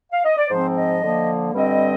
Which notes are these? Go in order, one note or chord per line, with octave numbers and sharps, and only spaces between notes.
F5
D#5
D5
G#2 F3 C4 C5
D#5
D3 F3 A#3
G2 D3 G3 C4 D#5